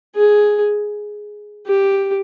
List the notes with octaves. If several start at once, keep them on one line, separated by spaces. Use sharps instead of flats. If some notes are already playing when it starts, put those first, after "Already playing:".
G#4
G4